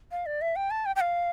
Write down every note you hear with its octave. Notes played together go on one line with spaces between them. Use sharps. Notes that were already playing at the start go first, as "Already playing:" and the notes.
F5
D5
E5
G5
A5
G5
G5
F5